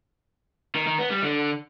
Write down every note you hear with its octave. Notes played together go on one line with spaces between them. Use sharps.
D#3
D#3
B3
G3
D3